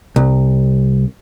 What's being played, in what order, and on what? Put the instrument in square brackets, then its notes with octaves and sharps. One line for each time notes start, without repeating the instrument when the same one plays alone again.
[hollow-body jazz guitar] C2